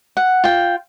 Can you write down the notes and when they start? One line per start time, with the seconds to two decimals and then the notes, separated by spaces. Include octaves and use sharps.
0.17 F#5
0.44 F4 G5